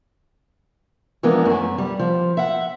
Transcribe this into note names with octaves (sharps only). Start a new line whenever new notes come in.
E3 F3 G#3 B3 D4 A#4
F#2 A3
G3
F3
E5 F#5